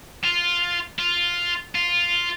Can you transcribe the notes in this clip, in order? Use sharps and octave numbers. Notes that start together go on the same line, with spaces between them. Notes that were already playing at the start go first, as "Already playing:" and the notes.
F4
F4
F4